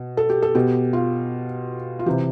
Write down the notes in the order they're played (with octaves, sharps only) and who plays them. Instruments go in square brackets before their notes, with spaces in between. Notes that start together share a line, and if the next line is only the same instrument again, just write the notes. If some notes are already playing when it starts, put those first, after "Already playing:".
Already playing: [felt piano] B2
A4
G4
A4
B2 G4
F4
F4
C3 E3 G4